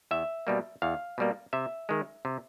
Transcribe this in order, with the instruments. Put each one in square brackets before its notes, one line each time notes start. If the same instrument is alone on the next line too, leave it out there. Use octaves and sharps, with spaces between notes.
[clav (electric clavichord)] E2 E5
B2 G3 A#3
E2 F5
B2 G3 A#3
C3 E5
D#3 G#3
C3